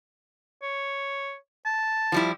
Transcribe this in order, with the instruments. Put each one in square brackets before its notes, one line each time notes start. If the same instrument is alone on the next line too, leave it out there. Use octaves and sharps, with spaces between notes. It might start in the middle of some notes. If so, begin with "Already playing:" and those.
[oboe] C#5
A5
[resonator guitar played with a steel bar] F3 G3 E4